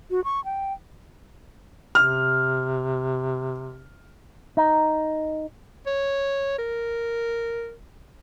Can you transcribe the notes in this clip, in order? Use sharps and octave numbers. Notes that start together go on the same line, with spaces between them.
F#4
C#6
G5
C3 F6
D#4
C#5
A#4